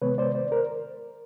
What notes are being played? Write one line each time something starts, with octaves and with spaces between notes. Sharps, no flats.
C3 D#3 G#3 B3 B4 C#5
C5 D5
C5 D5
A#4 C5